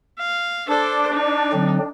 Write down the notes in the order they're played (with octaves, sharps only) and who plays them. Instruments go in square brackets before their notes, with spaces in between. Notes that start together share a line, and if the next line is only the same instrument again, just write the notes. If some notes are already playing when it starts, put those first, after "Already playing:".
[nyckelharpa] F5
[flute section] D4 [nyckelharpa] A4 C5
[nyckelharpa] D#4
[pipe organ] D3 F#3 C4